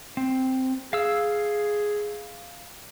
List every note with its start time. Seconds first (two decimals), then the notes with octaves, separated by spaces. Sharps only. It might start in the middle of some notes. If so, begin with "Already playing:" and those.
0.17 C4
0.93 G#4 F5 E6